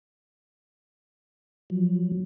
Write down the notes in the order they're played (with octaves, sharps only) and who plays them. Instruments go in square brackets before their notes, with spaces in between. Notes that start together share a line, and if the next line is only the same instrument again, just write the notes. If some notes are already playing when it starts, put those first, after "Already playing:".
[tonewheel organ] F3 F#3